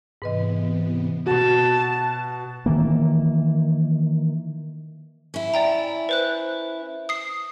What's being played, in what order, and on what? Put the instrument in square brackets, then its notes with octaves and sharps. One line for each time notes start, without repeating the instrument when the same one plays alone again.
[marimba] G#2 B4 D#5 [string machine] C3 E3 B3
[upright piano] B2 F#4 [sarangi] A5
[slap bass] D#3 E3 A#3
[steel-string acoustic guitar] C#4 E4
[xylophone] D5 G5 A#5
B4 C5 F#6
D#6 C7